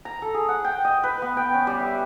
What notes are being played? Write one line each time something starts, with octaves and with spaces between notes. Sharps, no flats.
A#5
A4
G#4
F#5
G5
D#5
B4
B3
G5
C#4
G3
E5